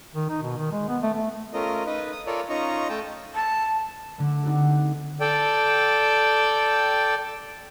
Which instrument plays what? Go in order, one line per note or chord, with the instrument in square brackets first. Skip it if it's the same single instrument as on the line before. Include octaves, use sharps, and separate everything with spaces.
[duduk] D#3
D#4
B2
D#3
G#3
B3
A3
A3
[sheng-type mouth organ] A3 C#4 F4 A#4 D#5
D#4 B4 D#5
D#6
F4 A4 A#4 C#5 D5
C#4 D#4 F4 D#5 A#5 C#6
A3 G5 A5
[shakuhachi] A5
[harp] D3 A3
C4 D#4 F#4 G4 A4
[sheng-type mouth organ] A4 D5 G5